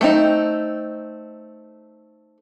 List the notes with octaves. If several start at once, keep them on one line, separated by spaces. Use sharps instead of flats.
A3 C4 D#4